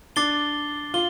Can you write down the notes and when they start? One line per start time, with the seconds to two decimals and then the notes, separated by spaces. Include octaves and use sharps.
0.16 D4 D6 A6 C7 G7
0.94 F4 G7